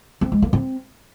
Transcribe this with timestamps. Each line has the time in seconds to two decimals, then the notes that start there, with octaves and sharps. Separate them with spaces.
0.21 C4
0.32 G#3
0.42 A#3
0.53 C4